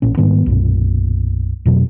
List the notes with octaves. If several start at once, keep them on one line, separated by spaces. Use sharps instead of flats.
A1 A#2 C#4
G#2 D#3 G3 B3
B1 F#2 A#2
F2 B2 F#3